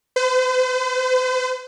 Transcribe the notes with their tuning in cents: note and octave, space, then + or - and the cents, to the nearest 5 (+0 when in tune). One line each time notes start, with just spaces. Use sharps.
C5 -45